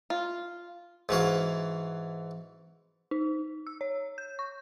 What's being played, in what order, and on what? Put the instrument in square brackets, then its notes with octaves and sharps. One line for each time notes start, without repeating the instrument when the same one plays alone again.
[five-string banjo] F4
[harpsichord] G#2 E3 F#4 F5
[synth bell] D#4
E6
C#5
G6
C#6